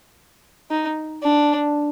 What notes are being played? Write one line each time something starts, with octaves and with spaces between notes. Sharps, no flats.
D#4
D4